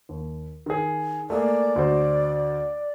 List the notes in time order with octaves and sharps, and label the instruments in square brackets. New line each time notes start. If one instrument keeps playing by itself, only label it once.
[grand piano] D#2
D#3 G#4
[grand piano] A3 A#3 G#4 [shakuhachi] D5
[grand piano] D2 F#4 C5